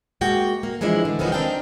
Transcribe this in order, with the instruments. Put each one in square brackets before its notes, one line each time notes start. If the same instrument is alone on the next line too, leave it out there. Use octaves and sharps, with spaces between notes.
[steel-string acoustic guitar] G#3 A#3 F#4 G5
A#3
E3 F3 G#3 D4 E4
D3
E2 D#3 F3 F#3 G#3 B3
C4 D4 D#4 A#4 F5 G5